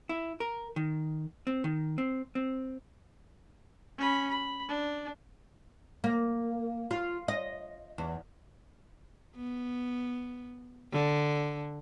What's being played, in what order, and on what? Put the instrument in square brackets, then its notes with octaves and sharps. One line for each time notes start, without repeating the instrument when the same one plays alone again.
[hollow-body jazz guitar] E4
A#4
D#3
C4
D#3
C4
C4
[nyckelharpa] C#4 B5
B5
D4
[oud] A#3
F4
D#5
E2
[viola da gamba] B3
D3